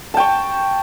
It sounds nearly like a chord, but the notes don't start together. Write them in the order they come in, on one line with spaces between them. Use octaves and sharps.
A5 G5 C#6